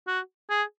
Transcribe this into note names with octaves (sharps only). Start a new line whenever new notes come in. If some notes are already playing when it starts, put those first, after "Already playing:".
F#4
G#4